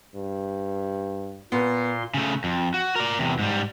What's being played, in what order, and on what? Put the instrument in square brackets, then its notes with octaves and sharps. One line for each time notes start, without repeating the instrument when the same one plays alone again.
[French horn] G2
[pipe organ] A#2 C6 [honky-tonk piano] B3
[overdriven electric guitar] C#3 A3
F2
F#4
A#4 D5
E2 C3
G#2 G3